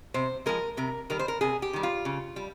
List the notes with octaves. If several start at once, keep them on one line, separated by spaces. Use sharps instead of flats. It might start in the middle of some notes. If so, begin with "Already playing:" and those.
C3 C5
F3 G#3 A#4
C3 A#4
D#3 G3 A#4
C5
A#4
C3 G#4
G4
D#3 G3
F4
C#3
G3